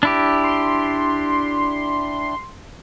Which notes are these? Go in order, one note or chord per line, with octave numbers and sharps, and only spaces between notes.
D4 E4 G4
C6